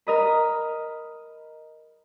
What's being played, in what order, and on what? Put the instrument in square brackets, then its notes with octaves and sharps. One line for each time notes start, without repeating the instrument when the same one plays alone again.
[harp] A#4 D#5 B5